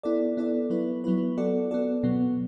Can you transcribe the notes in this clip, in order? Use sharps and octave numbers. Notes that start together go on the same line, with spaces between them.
B3 E4 A4 D5
B3 E4 A4 D5
F#3 B3 E4 B4
F#3 B3 E4 B4
B3 F#4 A4 D5
B3 F#4 A4 D5
B2 F#3 B3